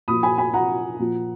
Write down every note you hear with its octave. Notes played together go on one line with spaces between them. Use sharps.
A#2 F3 B5 D#6
G#5 B5
G#5 B5
F#5 A#5
A#2 F3